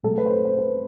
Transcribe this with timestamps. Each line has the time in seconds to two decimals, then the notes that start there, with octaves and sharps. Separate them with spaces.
0.03 B2 F#3 A3 A4
0.18 B4
0.26 C5
0.32 B4
0.45 C5
0.59 B4